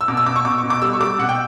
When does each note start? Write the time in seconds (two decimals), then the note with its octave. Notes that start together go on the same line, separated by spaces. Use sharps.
0.01 E6
0.08 B2 D6
0.17 E6
0.26 B2 D6
0.36 C#6
0.45 B2 D6
0.58 C#6
0.63 B2
0.70 D6
0.82 G3 E6
0.93 C#6
1.00 G3 D6
1.19 B2 F#5
1.29 G5